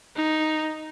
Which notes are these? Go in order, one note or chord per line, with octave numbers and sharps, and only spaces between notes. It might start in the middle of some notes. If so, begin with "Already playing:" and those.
D#4